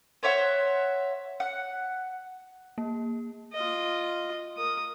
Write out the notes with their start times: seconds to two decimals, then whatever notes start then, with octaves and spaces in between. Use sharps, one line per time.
0.23 C5 C#5 E5 F#5
1.40 F#5
2.78 A#3
3.53 F4 D#5
4.57 A#4 D#6